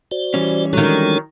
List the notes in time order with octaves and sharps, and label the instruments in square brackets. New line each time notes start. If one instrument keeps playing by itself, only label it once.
[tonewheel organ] F#4 C5 D5
[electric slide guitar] E3 G3 C#4
[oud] D#3 F#3 [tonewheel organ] G#3 D4 A4